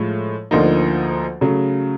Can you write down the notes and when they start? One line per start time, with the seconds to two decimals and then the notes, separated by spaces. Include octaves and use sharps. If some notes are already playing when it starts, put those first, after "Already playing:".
Already playing: A2 F3 G#3
0.51 D2 D3 F3 A#3 D#4
1.41 C#3 F#3 A3